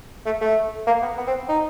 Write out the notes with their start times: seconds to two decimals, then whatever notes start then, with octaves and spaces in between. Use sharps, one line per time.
0.26 A3
0.41 A3
0.87 A#3
1.02 B3
1.18 B3
1.27 C4
1.49 D#4